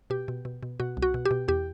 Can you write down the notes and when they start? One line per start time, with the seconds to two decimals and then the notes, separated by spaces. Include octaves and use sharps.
0.10 B2 G4
0.28 B2
0.45 B2
0.63 B2
0.80 B2 F#4
0.97 C2
1.02 F#4
1.14 B2
1.25 G4
1.31 B2
1.48 E2 G4